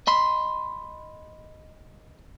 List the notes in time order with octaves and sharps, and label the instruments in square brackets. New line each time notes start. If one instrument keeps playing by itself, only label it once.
[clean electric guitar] D#5 B5 C6